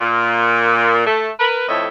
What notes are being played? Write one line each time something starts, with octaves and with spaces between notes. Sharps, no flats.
A#2
A3
A#4 B4
F2 A2 C#5 D#5 E5